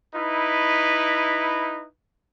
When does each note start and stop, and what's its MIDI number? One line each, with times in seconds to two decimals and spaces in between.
0.14 1.86 63
0.14 1.86 64
0.14 1.86 71